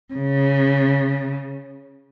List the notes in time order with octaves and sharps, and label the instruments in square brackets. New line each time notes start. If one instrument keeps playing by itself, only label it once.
[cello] C#3